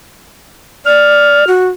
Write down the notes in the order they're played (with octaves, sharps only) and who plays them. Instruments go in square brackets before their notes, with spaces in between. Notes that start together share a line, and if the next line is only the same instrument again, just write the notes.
[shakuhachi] D5 [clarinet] F6
[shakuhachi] F#4